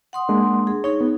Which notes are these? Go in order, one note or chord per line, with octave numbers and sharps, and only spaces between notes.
F#5 C6 D#6
G#3 A#3 D4
G#4
D#4 G#4 C#5
B3